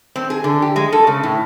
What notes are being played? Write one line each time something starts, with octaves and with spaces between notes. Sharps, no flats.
C4
G#4
D3
G4
G#3
A4
C#3
A2